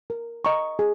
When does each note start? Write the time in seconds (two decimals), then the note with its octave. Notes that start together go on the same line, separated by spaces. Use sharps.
0.10 A#4
0.45 D#5 A#5 C#6
0.79 G#4